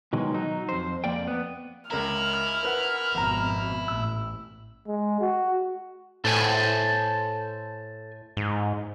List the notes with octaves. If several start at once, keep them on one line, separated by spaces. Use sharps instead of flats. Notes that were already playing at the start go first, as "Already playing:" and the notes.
B2 D#3 F#3 G#3
F#3 D#4
F2 C5
F2 A#3 D5 G5
B3
C#2 E4 A#4 A#5 F6
A#4 B4 F#5
G#1 F2 B2 A#5
A1 E6
G#3
F#4
A2 A4 C5 G#5
G#2